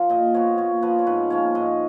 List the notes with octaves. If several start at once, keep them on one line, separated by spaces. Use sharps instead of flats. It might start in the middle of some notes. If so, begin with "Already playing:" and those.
Already playing: F3 F5
A#2 D#5
F3 B3 C#5
A#2 C#5
F3 B3 B4
C#5
G#2 B4
F3 A#3 C#4 C#5
G#2 D#5